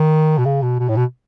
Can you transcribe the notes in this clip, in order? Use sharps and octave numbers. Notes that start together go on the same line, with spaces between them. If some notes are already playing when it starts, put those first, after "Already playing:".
Already playing: D#3
B2
C#3
B2
B2
A2
B2